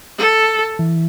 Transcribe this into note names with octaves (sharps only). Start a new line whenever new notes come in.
A4
E3